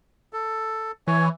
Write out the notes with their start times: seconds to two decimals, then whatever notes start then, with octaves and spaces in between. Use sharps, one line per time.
0.33 A4
1.07 E3 C#5 G#5